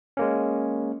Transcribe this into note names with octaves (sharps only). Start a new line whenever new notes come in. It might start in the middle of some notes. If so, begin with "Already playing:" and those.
G#3 A#3 C#4